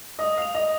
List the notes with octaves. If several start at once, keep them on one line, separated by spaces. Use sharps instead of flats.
D#5 D#6
F5 F7
D#5